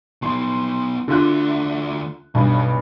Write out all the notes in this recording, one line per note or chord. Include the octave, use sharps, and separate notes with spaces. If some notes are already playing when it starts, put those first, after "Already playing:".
B3 D#4 C6
D2 D3 F4 E5 F#6
B1 G2 B2